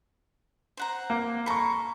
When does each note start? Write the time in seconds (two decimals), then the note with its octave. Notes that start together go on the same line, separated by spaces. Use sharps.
0.77 C5 F#5 A#5
1.10 A#3
1.46 A4 A#5 B5 C#6